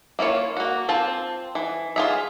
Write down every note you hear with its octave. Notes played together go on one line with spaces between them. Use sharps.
A#3 E4 F4 C#5
A#3 F#4
C4 F4 A5
E3
F4 G#4 E5